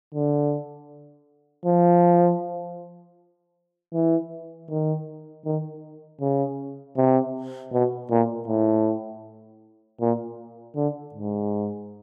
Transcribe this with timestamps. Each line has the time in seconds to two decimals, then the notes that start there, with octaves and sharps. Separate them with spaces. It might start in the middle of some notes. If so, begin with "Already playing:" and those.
0.14 D3
1.65 F3
3.93 E3
4.70 D#3
5.45 D#3
6.21 C#3
6.97 C3
7.72 B2
8.10 A#2
8.48 A2
10.01 A#2
10.76 D3
11.14 G#2